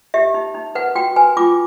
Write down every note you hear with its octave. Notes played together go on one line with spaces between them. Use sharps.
G4 E5
D#4
D#4
B4 F#5
F#4 G5
B4 G#5
F4 D6